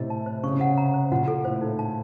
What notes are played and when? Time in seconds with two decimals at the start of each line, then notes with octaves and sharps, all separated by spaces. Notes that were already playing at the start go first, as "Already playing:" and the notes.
Already playing: A2 C3 D#5
0.10 A5
0.26 C5
0.43 C#3 C#6
0.52 C3
0.59 C#3 F#5
0.78 A#5
0.94 C5
1.12 A#2 F#5
1.28 A4
1.45 A2 C5
1.61 D#4
1.79 A5